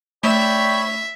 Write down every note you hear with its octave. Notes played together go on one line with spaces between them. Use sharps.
A3 C#5 D5 E5 G5 B5